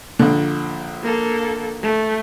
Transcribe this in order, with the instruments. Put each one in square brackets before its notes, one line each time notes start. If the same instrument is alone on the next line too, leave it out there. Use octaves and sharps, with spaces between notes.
[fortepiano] A#1 D3
[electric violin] A#3 A4
A3